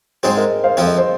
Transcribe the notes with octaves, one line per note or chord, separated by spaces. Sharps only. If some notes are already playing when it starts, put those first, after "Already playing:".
G#2 G#3 C4 G#4 C5
A#4 D#5
C5 F5
F2 F3 C4 F5
D#5
C5